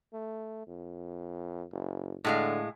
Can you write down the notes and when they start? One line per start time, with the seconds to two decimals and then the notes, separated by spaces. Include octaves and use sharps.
0.14 A3
0.67 F2
1.72 F#1
2.25 A2 D3 G#3 F5